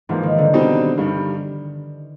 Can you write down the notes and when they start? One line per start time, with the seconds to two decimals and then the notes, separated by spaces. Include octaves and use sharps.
0.09 G#2 E3 F3 A#3
0.23 D#3
0.38 D3
0.53 B2 G3 C4 D#4
0.97 G2 D#3 G3